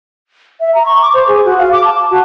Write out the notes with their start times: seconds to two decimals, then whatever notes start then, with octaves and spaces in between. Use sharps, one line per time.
0.60 E5
0.74 A#5
0.86 C#6
1.02 D6
1.14 C5
1.28 G#4
1.45 F#4
1.58 F5
1.72 D6
1.84 A5
2.11 F#4